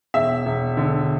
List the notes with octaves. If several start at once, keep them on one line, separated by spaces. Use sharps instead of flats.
E1 E5
E1
D3